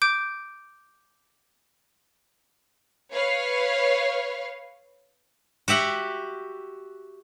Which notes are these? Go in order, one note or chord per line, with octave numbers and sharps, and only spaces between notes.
D6 G6 D7
B4 C#5 F5
F#4 G4 E5 F#5